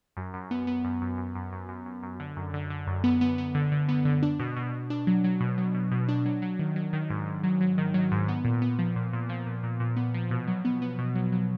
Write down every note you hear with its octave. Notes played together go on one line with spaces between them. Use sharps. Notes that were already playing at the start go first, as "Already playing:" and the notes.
F#2
F#2
B3
B3
F#2
F#2
F#2
F#2
F#2
F#2
F#2
F#2
D3
F#2
D3
D3
F#2
B3
B3
B3
D3
D3
B3
D3
D4
B2
B2
B2
D4
F#3
F#3
B2
F#3
B2
B2
D4
F#3
F#3
D#3
F#3
D#3
G#2
G#2
F#3
F#3
D#3
F#3
G#2
B3
A#2
B3
F3
A#2
A#2
F3
A#2
A#2
A#2
B3
F3
B2
F#3
B3
B3
B2
F#3
F#3